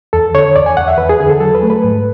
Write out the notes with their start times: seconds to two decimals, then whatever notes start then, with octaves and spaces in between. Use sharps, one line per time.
0.13 E2 A4
0.35 D3 C#5
0.56 E2 D5
0.66 G#5
0.77 E2 F#5
0.88 E5
0.98 E2 B4
1.09 G#4
1.20 D3 G#4
1.30 A4
1.40 F#3 A4
1.55 B4
1.63 A3
1.70 B4
1.84 G#2